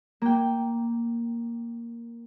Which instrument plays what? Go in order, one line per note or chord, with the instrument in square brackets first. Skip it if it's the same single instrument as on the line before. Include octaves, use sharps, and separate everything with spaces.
[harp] A#3 G5